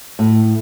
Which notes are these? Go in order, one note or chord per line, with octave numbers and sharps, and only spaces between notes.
A2